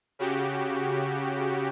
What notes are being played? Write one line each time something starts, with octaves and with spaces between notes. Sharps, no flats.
C#3 F#4 G4